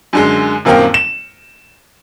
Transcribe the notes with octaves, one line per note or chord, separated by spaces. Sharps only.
F#2 D3 G#3
D#1 F#2 A#3 C4 F5 G5
E7